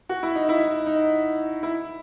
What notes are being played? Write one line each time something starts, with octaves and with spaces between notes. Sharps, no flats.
F#4
E4
D#4
E4
D#4
E4